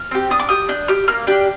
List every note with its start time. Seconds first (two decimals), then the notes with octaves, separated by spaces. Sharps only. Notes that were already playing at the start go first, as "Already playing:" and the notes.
Already playing: F6
0.11 C4 G4
0.30 D4 D#6
0.39 D6
0.49 G4 D#6
0.69 D4 G6
0.88 G4 F6
1.08 A#3 F6
1.27 D4 G4